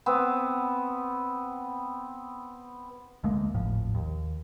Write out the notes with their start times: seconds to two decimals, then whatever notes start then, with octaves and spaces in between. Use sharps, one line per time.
0.06 B3 C4
3.23 D2 G#3 A#3
3.55 G#1 D#2 A2 F3
3.94 D#2